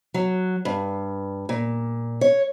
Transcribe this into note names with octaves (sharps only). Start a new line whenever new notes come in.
F#3
G2
A#2
C#5